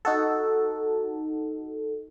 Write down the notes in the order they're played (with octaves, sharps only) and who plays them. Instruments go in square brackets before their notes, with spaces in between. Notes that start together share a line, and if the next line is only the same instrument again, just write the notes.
[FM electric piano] D#4 F#4 A4